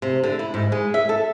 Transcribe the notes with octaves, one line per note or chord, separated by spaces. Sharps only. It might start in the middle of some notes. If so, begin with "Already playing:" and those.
C3
D3
E4
G#2
G#3
E5
A4